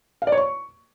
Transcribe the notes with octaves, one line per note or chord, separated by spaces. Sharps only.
F5
D5
C#5
C#6